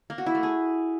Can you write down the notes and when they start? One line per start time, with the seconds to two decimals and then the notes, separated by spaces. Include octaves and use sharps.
0.10 A#3
0.18 F#4
0.26 E4
0.35 A3
0.43 G#4